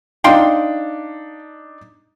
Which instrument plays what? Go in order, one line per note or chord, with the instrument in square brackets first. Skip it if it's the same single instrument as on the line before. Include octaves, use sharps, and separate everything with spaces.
[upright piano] D4 D#4 [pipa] F5 G5 C6